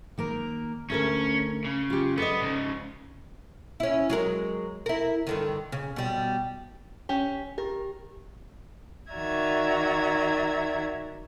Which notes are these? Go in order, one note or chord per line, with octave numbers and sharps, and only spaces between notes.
D#3 A#3 A#4
D2 C#4 A4 A#4
C#3
F4 G4
B3 A4 D5 D#5
G#2 C#3
C#4 E4
F#3 G#3 A#4
E4 A#4
G2 D3 D#3
C#3
B2 G3
C#4 G4
G4 A#4
D#3 F#4 D5 E5 A#5 G#6